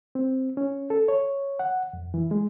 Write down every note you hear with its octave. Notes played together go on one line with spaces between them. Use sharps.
C4
C#4
A4
C#5
F#5
F2
E3
G#3